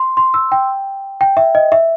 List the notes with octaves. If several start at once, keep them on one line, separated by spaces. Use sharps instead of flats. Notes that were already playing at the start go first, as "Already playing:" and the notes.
Already playing: C6
C6
E6
G5
G5
E5
D#5
E5